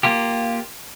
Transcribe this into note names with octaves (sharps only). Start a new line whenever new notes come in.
A#3 F4 G4